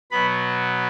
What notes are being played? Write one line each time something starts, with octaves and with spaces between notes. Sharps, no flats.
B2 F#3 B3 B4 B5